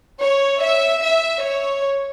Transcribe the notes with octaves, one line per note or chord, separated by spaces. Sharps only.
C#5
E5
E5
C#5